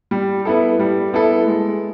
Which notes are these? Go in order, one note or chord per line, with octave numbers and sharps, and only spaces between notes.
G3
B3 E4 A4
G3
B3 E4 A4
G#3